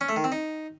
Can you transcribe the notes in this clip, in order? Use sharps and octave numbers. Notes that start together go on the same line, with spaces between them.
C#4
A3
D#3
C4
D#4